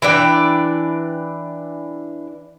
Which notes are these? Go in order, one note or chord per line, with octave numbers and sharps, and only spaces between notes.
E3 D4 D5 G5